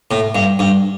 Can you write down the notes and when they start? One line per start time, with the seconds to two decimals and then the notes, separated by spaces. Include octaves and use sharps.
0.11 A2
0.35 G2
0.59 G2